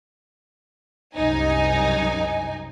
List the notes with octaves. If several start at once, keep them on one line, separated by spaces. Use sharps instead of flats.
C2 F#2 D#4 G#5